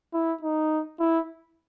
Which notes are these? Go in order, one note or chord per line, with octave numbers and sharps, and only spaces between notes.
E4
D#4
E4